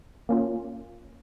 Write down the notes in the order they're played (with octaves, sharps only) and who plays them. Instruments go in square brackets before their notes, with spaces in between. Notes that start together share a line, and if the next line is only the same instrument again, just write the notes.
[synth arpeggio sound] A#3 C#4 F4